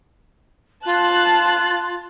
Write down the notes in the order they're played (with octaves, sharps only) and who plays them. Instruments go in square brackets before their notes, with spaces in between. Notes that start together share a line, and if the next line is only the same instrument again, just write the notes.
[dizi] F4 [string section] A5 F#6